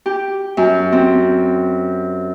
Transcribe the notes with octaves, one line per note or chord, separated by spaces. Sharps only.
G4
F#2
C4